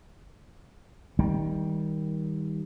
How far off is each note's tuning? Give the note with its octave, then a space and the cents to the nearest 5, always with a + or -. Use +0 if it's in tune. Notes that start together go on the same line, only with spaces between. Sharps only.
D#3 +20 G3 +0